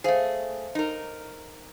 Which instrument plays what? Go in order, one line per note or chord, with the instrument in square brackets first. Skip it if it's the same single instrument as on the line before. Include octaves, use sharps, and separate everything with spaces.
[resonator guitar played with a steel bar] A3 G#4 [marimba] C5 F5
[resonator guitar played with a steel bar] D#4 A#4